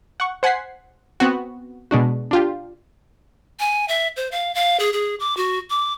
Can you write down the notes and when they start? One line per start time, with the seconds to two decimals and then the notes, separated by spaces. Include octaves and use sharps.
0.20 F#5 C#6
0.43 C5 F#5 G#5 G#6 B6 C7
1.20 B3 C4 F#4
1.91 B2 G#3 D4 F#4
2.31 D4 F4 G4
3.60 G#5
3.88 E5
4.17 C5
4.32 F5
4.55 F5
4.80 G#4
4.93 G#4
5.20 D6
5.37 F#4
5.70 D6